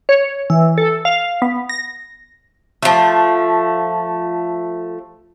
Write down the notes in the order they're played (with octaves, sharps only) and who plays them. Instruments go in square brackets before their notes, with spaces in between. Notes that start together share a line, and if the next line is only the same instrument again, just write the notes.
[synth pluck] C#5
E3
A4
F5
B3
A#6
[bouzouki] F3 A3